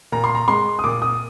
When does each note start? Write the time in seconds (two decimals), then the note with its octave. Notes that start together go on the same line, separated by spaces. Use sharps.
0.12 A#2 A#5
0.24 C6
0.35 A#5
0.48 G#3 C6
0.79 D#6
0.84 A#2 D6
1.02 D#6